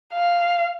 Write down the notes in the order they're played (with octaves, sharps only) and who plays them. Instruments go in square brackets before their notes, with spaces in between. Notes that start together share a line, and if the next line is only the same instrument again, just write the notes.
[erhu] F5